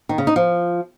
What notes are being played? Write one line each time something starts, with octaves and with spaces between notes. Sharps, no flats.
D#3
C#3
D#4
F3